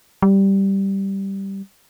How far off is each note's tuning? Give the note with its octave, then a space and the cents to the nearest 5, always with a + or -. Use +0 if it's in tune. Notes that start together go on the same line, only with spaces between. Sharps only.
G3 -5